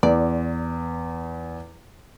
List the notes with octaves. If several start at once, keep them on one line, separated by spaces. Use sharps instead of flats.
E2 D5